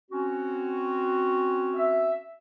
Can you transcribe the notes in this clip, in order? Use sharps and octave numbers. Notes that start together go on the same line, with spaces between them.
C4 C#4 F#4
E5